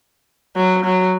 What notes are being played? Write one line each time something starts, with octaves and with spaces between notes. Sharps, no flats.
F#3
F#3